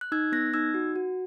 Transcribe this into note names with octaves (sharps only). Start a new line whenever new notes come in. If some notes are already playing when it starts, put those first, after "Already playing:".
F#6
D#4 E6 G#6
B3 F#6 A#6
D#4 E6 G#6
F#4
F#4